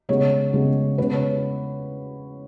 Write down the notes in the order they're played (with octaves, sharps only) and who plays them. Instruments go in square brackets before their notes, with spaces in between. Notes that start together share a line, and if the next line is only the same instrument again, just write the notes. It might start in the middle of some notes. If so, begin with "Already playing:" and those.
[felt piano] C#3 G#3 B3 C#5
C#3 G#3 B3
C#3 G#3 B3 B4
C#5